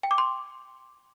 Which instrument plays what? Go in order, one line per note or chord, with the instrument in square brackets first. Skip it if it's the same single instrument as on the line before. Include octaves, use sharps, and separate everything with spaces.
[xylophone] G5
D6
C6